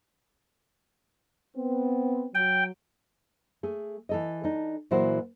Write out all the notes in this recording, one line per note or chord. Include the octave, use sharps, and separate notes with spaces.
B3 C4
F#3 G5
A3 G#4
E3 A4 D#5
D4 D#4
A#2 E3 F#3 E4 F#4 C5